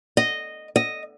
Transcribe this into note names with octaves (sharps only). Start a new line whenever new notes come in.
D#5
D#5